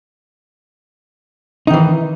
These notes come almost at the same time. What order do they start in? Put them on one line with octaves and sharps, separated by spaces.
D#4 D#3 E3